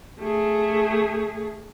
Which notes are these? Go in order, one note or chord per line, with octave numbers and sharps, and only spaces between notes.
A3 G#4